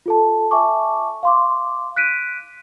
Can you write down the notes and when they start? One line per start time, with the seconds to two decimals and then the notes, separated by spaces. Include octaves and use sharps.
0.06 F4 A4 A5
0.51 E5 G#5 A5 C#6 D6
1.23 F5 C6 D6
1.96 F#6 B6 D7 D#7